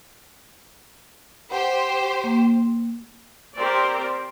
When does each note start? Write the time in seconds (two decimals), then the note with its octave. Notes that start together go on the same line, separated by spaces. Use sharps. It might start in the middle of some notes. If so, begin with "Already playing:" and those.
1.52 G4 C5 F#5
2.24 A#3
3.56 C4 G4 A#4 C5 D5